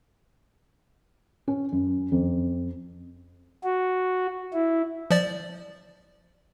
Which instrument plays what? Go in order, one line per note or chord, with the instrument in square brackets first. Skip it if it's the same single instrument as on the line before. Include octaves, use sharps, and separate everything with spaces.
[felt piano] C#4
F#2
F2
[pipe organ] F#4
E4
[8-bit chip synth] F3 D5